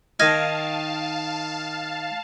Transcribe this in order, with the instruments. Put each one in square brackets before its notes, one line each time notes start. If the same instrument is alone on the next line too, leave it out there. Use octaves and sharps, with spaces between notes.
[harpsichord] D#3 D#4 [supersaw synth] F5 A5 [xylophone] F6 G#6 A#6